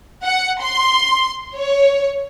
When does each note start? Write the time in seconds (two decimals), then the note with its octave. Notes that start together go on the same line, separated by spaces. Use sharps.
0.24 F#5
0.63 C6
1.56 C#5